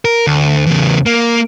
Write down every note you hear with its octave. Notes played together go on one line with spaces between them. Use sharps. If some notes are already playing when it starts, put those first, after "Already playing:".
A#4
D2
E2 C#3
A#3